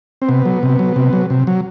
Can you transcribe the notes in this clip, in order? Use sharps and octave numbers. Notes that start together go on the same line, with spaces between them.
C4
C3 B3
F#3
C3
F#3
C3
F#3
C3
F#3